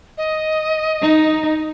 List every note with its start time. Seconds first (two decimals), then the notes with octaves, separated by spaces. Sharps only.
0.18 D#5
1.02 D#4